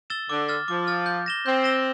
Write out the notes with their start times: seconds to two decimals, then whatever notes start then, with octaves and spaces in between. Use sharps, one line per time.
0.10 E6 A6 E7 G7
0.29 D3 D6
0.48 F6 A6
0.68 F3 D6
0.87 F6 A6
1.06 G6
1.26 A#6 E7 G7
1.46 C4 G6
1.64 A#6 E7 G7